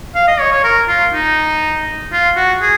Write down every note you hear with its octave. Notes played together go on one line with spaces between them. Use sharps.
F5
D#5
C#5
C#5
A#4
F4
D#4
F4
F#4
G#4